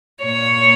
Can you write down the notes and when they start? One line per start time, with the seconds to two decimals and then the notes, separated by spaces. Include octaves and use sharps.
0.24 A#2 C#5